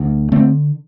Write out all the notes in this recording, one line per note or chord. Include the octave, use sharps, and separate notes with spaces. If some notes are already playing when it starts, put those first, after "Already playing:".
Already playing: D2
D3 A3 C4